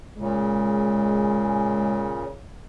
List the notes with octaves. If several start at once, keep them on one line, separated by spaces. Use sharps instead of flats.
A#2 C#3 G#3